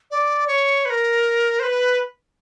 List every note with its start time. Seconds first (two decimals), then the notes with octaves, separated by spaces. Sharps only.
0.11 D5
0.47 C#5
0.85 B4
0.90 A#4
1.60 C5
1.63 B4